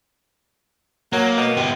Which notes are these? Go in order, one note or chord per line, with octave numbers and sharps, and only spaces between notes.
F#3 A#3
B2
B3 G4